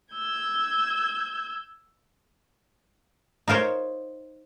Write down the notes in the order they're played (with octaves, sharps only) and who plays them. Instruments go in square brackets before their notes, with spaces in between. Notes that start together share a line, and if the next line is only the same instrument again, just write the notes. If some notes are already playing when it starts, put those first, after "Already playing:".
[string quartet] E6 G6 G#6
[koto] D#4 F4 A#4 C5 C#5